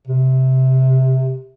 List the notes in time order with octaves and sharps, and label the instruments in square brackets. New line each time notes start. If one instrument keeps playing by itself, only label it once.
[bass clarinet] C3